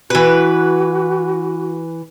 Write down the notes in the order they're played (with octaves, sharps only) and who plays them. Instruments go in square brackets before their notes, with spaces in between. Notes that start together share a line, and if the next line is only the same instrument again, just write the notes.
[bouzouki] E3 B4 [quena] F#4